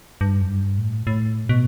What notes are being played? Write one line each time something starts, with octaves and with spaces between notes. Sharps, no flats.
G2
F#2
G2
A2
A2
B2